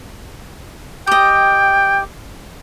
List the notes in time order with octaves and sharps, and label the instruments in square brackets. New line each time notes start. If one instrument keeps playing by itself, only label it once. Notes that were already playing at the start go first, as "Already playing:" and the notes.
[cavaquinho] G4 D#5 [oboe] G5